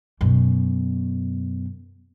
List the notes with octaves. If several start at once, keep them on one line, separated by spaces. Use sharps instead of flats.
F#2 B2